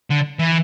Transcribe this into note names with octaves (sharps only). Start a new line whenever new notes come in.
D3
E3